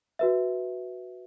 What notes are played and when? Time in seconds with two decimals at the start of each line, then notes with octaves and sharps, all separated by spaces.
0.19 F#4 B4 E5